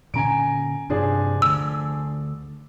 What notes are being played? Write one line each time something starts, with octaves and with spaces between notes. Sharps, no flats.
A#2 D3 C#4 G#5 A#5 D7
G2 C3 F3 D4 G#4
D2 D3 E6